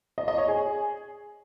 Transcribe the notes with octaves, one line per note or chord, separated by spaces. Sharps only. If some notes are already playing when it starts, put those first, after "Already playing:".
D#5
D#5
C#5
G#4